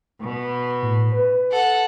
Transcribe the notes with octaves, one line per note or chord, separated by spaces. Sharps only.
B2
A2
B4
A4 F#5